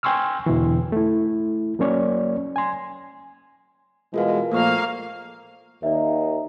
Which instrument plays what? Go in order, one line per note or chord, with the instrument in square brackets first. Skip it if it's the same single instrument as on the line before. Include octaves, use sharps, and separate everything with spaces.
[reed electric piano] G5 G#5 C6 C#6 E6 F6
E2 B2 D3 E3
A3 E4
F#3 A#3 C#4 C#5 D5
G#5 C6
[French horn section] B2 E3 G#3 [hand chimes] F4 A#4 F5
[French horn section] A#2 F3 [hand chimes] A3 A4 C#6 [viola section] A#3 F5
[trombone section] D#2 D#4 [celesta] D5 E5